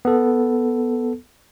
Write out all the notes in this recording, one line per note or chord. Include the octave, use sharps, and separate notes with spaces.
B3 A4